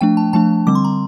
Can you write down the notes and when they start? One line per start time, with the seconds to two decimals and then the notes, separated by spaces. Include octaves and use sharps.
0.01 F3 A3 D4 G5
0.17 A5
0.33 F3 A3 D4 A5
0.67 D3 G3 C4 D6
0.75 C6
0.85 A#5